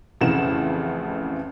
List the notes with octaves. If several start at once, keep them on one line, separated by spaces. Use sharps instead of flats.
A1 F2 A2 C#3 F#5 E7